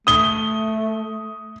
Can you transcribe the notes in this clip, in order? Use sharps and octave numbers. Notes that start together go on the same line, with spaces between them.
A3 D#6 G7